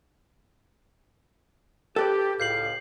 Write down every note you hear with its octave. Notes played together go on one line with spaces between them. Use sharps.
G4 A4 B4 D5
C#2 A2 F5 G6 C7 F#7